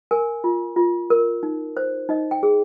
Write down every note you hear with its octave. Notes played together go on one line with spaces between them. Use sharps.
A#4 G#5
F4
F4
A#4
D#4
C5
D#4 D#5
G5
G#4